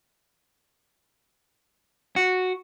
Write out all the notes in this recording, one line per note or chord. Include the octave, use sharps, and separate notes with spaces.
F#4